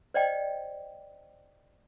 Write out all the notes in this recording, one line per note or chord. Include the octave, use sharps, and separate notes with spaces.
C5 D5 D#5 G5